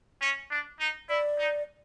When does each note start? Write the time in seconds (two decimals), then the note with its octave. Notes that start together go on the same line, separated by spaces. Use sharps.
0.21 C#4
0.50 D4
0.79 D#4
1.09 E4 D5
1.38 D#4